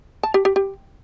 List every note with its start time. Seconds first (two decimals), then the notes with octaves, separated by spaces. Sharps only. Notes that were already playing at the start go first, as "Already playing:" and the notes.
0.23 A5
0.34 G4
0.45 G4
0.56 G4